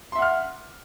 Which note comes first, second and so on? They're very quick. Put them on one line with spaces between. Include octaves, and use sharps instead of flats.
C6 E5 F#5 F6